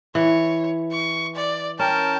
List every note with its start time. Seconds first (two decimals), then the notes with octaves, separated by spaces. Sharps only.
0.15 E3 C#5
0.92 C#6
1.35 D5
1.79 C#4 A#4 G5 A5